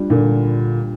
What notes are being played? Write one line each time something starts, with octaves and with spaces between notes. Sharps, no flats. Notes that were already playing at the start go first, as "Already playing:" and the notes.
Already playing: G3 D4 F4
A#2 D3